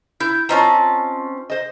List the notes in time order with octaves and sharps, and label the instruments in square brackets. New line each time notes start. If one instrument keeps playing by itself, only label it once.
[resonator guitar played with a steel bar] E4 [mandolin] G6
[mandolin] C4 C#4 A5 [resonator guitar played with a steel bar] F4 D#5 A#5
[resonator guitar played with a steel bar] C5 D#5